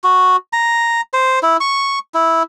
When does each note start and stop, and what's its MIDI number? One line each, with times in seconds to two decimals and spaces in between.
0.04 0.36 66
0.53 1.01 82
1.13 1.39 72
1.43 1.57 64
1.60 1.99 85
2.14 2.43 64